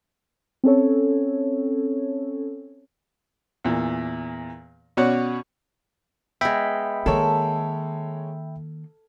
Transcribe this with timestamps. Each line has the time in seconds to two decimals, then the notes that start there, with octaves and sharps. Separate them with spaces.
0.64 C4 C#4 A4 C#5
3.65 E2 A#2
4.97 B2 C#4 F#4 C#5 D5 F#5
6.41 G#3 B3 E5 G5 B5
7.06 D#3 G#3 A#3 A4 A#4 C#5